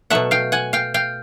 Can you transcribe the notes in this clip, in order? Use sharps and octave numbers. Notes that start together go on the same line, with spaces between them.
B2 F#3 A3 E5 F#5
F5 G5
F#5 G#5
F5 G5
F5 G5